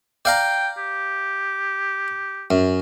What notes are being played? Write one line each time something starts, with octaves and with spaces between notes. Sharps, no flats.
D5 F5 G5 A#5
G4
F#2